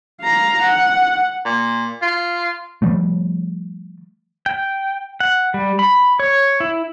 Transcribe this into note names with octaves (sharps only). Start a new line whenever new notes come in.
F5 A#5
F#5
A#2
F4
D#3 F3 G3 A3
G5
F#5
G3
B5
C#5
E4